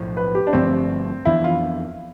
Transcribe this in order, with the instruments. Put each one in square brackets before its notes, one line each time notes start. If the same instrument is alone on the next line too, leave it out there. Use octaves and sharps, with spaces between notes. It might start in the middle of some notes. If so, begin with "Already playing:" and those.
Already playing: [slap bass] B1 A2 F3
[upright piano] B4
G4
D4
[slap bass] G1 G2 F3 A3 [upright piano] C4
[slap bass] F2 E3 B3 D4 [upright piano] E4
[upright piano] F4